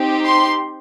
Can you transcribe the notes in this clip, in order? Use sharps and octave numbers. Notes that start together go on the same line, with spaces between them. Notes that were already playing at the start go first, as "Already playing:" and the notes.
Already playing: C4 D#4 G4
C6